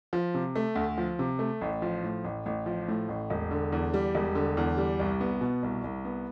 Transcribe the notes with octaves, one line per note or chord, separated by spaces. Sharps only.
F3
C3
A3
D2
F3
C3
A3
A1
F3
A2
A1
A1
F3
A2
A1
E1
D3
E2
G3
E1
D3
E2
G3
C2
B3
B2
C2
C2
B3